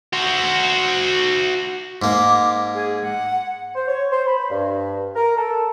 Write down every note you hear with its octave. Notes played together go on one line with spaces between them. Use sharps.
F#4 C5
G#2 A#3 D6
G#4
F#5
C5
C#5
C5
B5
G2
A#4
A4